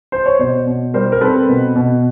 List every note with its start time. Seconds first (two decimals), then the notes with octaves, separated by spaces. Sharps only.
0.12 C5
0.26 C#5
0.39 B2 C5 D5
0.66 B2
0.94 G3 A#4 C5
1.12 A#4
1.21 C4 A4 B4
1.49 B2
1.76 B2